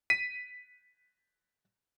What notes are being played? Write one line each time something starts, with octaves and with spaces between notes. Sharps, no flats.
B6 D#7